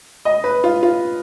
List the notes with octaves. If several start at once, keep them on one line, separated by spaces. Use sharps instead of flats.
D#5
B4
F4
F4